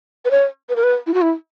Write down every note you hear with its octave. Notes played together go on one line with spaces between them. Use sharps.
B4
C#5
B4
A#4
B4
E4
F#4
E4